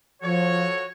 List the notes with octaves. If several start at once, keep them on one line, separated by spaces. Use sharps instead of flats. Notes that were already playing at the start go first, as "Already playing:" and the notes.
F3 F#4 A4 C#5